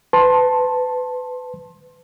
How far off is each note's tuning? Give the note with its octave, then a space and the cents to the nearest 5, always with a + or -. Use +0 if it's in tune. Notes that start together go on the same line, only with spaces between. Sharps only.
B4 +25 A5 +0 C6 +20